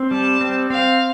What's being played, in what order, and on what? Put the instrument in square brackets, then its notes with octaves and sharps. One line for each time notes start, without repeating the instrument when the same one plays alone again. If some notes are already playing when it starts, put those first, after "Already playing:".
Already playing: [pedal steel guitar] C4
[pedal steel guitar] G3 [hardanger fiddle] A5
[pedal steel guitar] C4
[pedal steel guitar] C4 [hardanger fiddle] F5